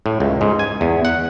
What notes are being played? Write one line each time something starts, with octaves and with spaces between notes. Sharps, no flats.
A2
C#2
G#2
G#5
E2
F#5